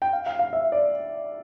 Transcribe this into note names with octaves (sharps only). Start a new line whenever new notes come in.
G5
F5
F5
F5
E5
D5